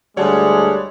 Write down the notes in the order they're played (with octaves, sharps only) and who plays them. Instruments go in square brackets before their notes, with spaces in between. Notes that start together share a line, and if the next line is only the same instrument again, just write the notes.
[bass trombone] D2 [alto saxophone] G3 [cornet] G#3 [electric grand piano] C#5 F#5 A5